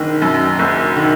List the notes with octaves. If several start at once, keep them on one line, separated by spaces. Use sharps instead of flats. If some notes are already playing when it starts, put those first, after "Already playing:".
Already playing: F#1 D#3
F#2
F#1
D#3